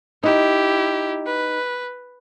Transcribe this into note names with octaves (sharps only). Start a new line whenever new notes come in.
D#4 E4 G4
B4